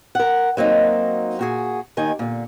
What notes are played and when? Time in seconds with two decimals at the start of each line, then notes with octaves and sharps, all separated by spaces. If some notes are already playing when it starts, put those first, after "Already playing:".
0.15 A#4 F#5
0.57 F#3 A#3 C4 D#4
1.39 A#2 F#4 G#4
1.97 D#2 D#3 G#5
2.19 A#2 D3